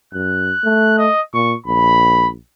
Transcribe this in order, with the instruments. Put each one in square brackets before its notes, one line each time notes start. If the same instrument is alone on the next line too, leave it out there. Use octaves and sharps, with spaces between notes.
[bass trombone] F#2 [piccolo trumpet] F#6
[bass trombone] A3
[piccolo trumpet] D#5
[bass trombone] A#2 [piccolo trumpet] C#6
[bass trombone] A#1 [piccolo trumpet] B5